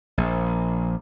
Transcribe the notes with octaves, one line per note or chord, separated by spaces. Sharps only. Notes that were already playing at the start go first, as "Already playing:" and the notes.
A#1